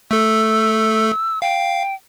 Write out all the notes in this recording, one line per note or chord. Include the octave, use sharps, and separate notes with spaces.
A3 A4 E6
F5 G5